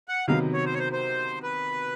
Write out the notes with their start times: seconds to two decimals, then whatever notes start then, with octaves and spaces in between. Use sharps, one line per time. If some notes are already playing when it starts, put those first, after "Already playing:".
0.09 F#5
0.28 C3 D#3 F#3 B3 F5
0.53 C#5
0.66 C5
0.74 C#5
0.79 C5
0.93 C5
1.43 B4